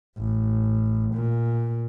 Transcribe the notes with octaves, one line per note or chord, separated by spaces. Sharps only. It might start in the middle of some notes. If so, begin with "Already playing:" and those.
A1
A#2